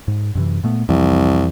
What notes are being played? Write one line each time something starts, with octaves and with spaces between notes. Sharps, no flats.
G#2
F#2 C3 E3
A#2 A3 B3
C2 F2 E3 F3